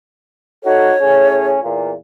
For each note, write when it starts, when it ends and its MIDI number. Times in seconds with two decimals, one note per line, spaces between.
0.64 0.93 63
0.64 0.93 66
0.64 0.93 69
0.64 1.47 73
1.01 1.57 45
1.01 1.57 61
1.01 1.57 68
1.63 1.92 40
1.63 1.92 46